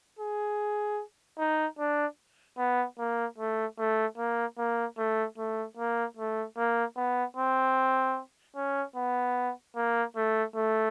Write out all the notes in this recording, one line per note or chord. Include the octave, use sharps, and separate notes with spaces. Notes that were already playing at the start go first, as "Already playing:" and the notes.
G#4
D#4
D4
B3
A#3
A3
A3
A#3
A#3
A3
A3
A#3
A3
A#3
B3
C4
C#4
B3
A#3
A3
A3